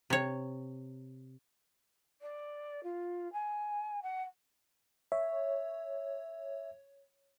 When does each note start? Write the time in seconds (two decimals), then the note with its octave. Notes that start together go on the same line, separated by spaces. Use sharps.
0.10 C3 C#5
2.21 D5
2.83 F4
3.33 G#5
4.02 F#5
5.12 C#5 E5